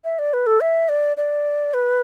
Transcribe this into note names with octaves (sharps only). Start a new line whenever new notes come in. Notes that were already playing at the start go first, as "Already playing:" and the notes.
E5
D5
B4
A4
E5
D5
D5
B4